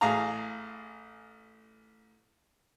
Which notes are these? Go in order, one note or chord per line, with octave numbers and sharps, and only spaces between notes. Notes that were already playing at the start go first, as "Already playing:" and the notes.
A1 G#4 F5 G#5 A#5